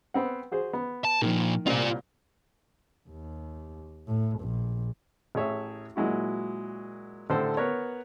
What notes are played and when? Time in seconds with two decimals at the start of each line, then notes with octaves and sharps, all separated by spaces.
0.14 B3 C4 F#5
0.52 F#4 G#4 C5
0.73 B3
1.05 A5
1.22 A#2 D#3 F3
1.66 C2 A#2 C4 F4 D5
3.09 D#2
4.07 A2
4.40 A#1
5.35 A1 G#4 C#5 E5
5.96 A#2 F#3 G#3 E4 F#4
7.30 A1 D3 A4 C5
7.57 B3 A#4 C#5